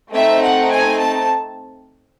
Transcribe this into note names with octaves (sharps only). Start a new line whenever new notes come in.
A3 C4 D#4 E5
F#5
G#5
A5